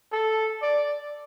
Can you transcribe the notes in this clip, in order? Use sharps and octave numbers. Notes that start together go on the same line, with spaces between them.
A4
D5